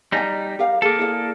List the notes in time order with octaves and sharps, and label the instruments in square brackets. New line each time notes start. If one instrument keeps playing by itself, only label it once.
[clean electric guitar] G3 D#4 [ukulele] D5 G#5 A#5
[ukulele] G4 A#4 F5
[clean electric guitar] A#3 A4 [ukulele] G#4 B4
[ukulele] E4 G#4 D5